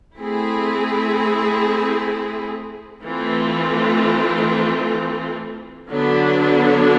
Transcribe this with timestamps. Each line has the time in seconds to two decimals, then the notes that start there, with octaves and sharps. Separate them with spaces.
0.19 A3 C4 E4 G#4
3.03 E3 A3 C4 F4
5.89 D3 F#3 B3 D4